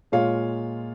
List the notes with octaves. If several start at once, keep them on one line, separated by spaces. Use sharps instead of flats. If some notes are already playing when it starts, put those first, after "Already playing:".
A#2 G#3 F4 C#5 F5